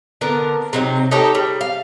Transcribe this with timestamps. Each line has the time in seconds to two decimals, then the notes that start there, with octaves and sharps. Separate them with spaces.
0.21 D3 B3 D4 A#4
0.73 C3 F#3 D#4
1.11 D#4 G4 A4 C#5
1.35 G3
1.61 F5